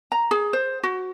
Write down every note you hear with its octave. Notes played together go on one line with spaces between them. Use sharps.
A#5
G#4
C5
F#4